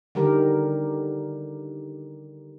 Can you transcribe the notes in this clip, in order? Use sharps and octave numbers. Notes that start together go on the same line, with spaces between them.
D3 D#3 G3 G4 A#4